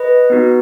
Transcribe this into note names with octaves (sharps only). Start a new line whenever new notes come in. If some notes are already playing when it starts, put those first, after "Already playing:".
Already playing: B4 D#5
B3 D#4 F#4